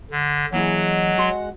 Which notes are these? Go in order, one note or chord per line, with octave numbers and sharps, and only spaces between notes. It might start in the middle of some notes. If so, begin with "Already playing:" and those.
D3
E3 F#3 G#3 A#3 E4 F#5
F#4 C6